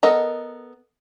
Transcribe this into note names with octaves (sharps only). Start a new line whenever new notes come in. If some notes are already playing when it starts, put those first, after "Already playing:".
B3 A4 A#4 D#5 A#5